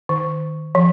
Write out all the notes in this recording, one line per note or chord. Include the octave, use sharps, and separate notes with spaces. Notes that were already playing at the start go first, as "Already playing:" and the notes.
D#3
F3